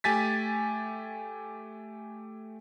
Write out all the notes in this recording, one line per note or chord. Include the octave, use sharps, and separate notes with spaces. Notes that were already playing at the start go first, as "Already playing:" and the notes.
A3 G4 G#5 A6 B6